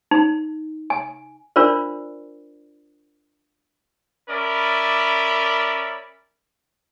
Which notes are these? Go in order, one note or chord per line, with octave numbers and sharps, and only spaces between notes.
D#4
G#5
D4 F4 A#4 C5 D5
C#4 A#4 D5 E5 B5